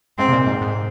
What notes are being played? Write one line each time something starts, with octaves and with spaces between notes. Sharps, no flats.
G#2 C4
C3
A#2
G#2
G#2